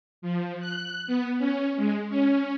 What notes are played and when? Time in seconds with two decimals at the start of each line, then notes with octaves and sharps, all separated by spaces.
0.22 F3
0.60 F#6
1.07 B3
1.38 C#4
1.76 G#3
2.09 C#4